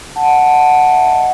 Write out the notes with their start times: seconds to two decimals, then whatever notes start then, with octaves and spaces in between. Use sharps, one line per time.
0.16 F#5 A5
0.38 F#5 A5
0.60 F#5 A5
0.82 E5 G#5
1.03 D#5 F#5